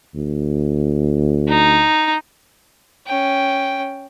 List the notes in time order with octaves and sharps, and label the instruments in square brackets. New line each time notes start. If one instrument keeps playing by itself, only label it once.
[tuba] D2
[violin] D#4
[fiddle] C#4 G5